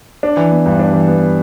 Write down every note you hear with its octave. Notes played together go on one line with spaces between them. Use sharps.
D4
E3
B3
G2
D4
E3
B3